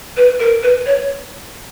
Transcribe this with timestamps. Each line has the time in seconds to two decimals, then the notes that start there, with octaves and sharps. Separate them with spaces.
0.17 B4
0.40 A#4
0.63 B4
0.86 C#5